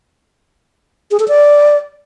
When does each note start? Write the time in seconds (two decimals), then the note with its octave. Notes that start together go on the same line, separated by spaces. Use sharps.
1.11 G#4
1.20 A4
1.28 D5